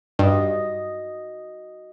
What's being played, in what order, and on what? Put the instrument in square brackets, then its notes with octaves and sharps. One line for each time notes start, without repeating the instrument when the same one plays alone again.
[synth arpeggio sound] G2 [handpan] F#4 D#5